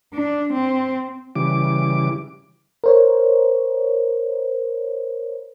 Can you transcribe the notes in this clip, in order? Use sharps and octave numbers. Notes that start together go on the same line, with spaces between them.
D4
C4
C#3 E3 G3 D6
A#4 C5 C#5